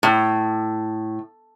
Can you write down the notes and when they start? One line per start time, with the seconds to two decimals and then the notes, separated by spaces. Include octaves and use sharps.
0.03 A2